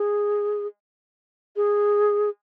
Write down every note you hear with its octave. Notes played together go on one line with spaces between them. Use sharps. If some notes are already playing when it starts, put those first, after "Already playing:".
Already playing: G#4
G#4